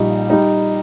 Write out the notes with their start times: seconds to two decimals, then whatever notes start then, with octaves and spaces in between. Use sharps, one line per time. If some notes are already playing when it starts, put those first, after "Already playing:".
Already playing: A#1 A#2 G3 D#4
0.30 G3 D#4